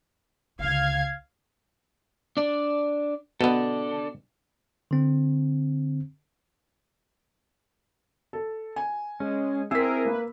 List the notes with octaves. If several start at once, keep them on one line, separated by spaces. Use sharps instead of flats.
C#2 D3 F5 G#6
D4 D5
B2 B3 D4 A4
D3 C4
A4
G#5
G#3 C#4
C4 E4 G#4 A#4 E6 B6
A#3 B4